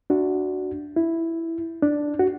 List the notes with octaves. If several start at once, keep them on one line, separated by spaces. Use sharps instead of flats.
D4 F#4
E4
D4
F#4